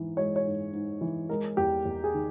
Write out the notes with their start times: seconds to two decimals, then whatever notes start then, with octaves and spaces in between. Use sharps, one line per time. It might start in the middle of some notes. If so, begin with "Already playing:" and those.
Already playing: G#2 E3
0.17 G#3 C#5
0.36 C#5
0.44 G#2
0.73 G#2
1.01 E3
1.29 G#3 A#4
1.57 E2 G4
1.85 E2
2.04 G#4
2.14 D#3